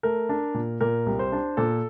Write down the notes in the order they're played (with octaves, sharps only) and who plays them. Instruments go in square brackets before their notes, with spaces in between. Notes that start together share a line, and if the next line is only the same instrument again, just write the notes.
[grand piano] A3 A#4
D4
A#2
A#2 A#4
C2
C5
D4
A#2 A4